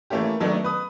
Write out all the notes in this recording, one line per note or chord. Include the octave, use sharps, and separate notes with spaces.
E3 A3 A#3 C#4 G4
D#3 F#3 A3 B3 D4
B4 D#6